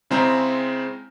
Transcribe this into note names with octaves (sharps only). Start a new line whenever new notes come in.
C#3 G#3 C4 E4 A#5